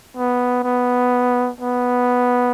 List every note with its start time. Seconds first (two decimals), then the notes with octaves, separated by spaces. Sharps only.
0.17 B3
0.64 B3
1.60 B3